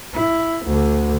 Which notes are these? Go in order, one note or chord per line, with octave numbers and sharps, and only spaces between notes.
E4
D2 D3